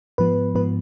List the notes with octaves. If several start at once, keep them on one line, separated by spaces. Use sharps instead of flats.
G#2 F3 B3 B4
G#2 F3 B3 B4